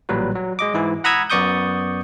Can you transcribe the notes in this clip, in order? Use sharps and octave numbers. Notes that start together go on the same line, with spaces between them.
A1 A#2 F#3 G3 B4
F#3
G#3 D#5 D6
G#2 E3 E4
F#5 A#5 B5 D#6 E6 G#6
F#2 B3 D5 C#6 D#6 G6